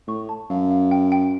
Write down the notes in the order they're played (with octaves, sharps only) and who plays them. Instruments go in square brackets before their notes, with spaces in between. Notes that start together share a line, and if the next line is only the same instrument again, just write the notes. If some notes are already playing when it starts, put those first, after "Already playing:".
[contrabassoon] A2 [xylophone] C#6
[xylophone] A5
[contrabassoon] F#2 [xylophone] F5
[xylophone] F5
G5
G5